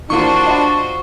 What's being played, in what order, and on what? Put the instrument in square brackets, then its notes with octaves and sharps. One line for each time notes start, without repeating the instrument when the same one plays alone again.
[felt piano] E3 A#3 [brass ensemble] D4 [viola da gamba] F4 F#4 C5 [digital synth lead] C#6
[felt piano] D#5 F#5 B5